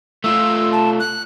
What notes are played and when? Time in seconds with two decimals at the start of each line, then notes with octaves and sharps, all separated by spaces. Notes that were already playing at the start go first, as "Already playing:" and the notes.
0.24 A3 F4 E6
0.72 A5
1.00 F#6